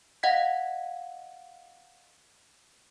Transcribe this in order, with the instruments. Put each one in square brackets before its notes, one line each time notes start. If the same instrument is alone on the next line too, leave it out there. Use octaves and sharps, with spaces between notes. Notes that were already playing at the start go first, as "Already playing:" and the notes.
[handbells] D#5 F5 F#5 G#6 B6